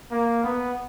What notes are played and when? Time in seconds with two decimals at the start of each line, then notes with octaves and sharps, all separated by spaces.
0.11 A#3
0.43 B3